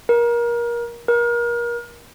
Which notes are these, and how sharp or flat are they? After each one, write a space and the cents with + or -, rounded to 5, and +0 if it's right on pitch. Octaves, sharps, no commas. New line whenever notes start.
A#4 +25
A#4 +30